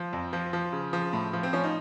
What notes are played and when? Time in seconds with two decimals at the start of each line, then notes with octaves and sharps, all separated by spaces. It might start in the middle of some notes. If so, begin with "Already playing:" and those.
Already playing: F3
0.13 F2
0.33 F3
0.53 F3
0.73 C#3
0.93 F3
1.13 A2
1.33 F3
1.43 C4
1.53 F3 C#4
1.64 D#4